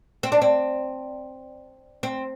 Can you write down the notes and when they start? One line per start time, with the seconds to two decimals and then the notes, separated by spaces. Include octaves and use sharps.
0.23 C4
0.32 D4
0.42 C4
2.03 C4